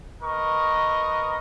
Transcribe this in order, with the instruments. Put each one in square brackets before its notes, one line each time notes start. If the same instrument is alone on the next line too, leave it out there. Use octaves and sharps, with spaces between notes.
[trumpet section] A#4 B4 D#5 C#6